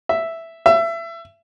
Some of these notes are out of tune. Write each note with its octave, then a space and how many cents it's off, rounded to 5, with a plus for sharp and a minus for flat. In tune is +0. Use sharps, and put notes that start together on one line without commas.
E5 +0
E5 +25